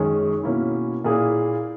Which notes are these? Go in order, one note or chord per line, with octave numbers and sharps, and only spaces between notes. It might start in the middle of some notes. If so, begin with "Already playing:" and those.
Already playing: F#2 D#3 G#3 C#4 G#4
B2 A#3 C#4 E4
A#2 A#3 E4 G#4